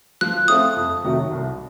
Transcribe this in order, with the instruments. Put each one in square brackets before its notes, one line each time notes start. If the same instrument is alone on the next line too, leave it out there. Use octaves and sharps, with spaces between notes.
[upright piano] F3 [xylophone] F#6
[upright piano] A3 C4 F4 A4 [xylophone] D#6
[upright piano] F2
C3 D#3 F#3 A3
C2